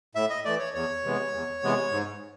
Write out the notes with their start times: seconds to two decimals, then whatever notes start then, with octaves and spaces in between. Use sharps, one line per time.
0.15 A2 E5
0.30 D#5
0.45 E3 A3 D5
0.59 C#5
0.74 E2 C#5
1.04 C3 E3 G#3 B3
1.33 E2
1.63 C3 E3 G#3 B3
1.92 G#2